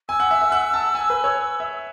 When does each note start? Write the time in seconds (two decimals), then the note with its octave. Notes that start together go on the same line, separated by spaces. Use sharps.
0.09 G#5 E6
0.20 F#5
0.31 E5
0.42 E5
0.52 F#5
0.74 A5
0.95 G#5
1.10 B4
1.24 C#5
1.60 E5